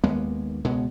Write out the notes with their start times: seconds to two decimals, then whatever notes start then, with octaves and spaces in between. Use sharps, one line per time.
0.04 D#2 G#3 A#3 B3
0.65 C#2 B2 G#3 B3